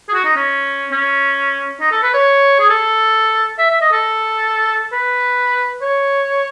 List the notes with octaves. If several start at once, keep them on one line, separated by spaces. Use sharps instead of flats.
G#4
F#4
D#4
C#4
C#4
D#4
A4
B4
C#5
G#4
A4
E5
E5
D#5
A4
B4
C#5